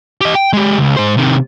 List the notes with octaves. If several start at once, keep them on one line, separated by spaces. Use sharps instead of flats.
G4 D#5
G5
G#3 G4
C#2
G#2 C5
C3 D#3